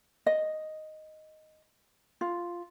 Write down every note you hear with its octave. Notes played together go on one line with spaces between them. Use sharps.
D#5
F4